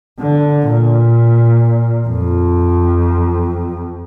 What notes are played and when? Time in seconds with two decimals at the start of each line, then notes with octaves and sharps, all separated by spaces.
0.19 D3
0.67 A#2
2.08 F2